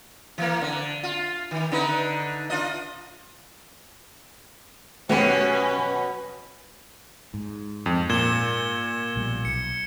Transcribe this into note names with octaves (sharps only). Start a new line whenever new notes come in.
E3 A#3
D3
F4
D#3
D3 D#4 B4
D4 F4 D#5
B2 F#3 A3 B3 C#4 G4 A#4 B4
G#2
F2
A#2 G#6 E7 G7
A#1 B2 G3
B1 C#7